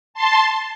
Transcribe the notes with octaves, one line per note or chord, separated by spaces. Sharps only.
A5 C6